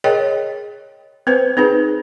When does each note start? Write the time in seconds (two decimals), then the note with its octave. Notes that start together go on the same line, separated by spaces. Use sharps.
0.04 G#4 A#4 C#5 D#5 G5
1.27 C4 B4 C5
1.57 C4 D#4 G#4 B4